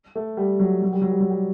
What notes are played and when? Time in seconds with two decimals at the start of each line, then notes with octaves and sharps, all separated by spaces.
0.15 A3
0.37 G3
0.60 F#3
0.82 F#3
0.92 G3
1.02 F#3
1.11 G3
1.20 F#3
1.30 G3